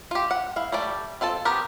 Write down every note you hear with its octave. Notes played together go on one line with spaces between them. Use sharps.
F4 G4
F#5
E4 F5
G3 A3 D5
C4 F4 A4 A5
B3 C4 G4 A#4 G5